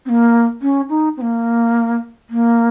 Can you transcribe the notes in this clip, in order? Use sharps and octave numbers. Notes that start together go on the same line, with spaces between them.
C4
A#3
C#4
D#4
C4
A#3
A#3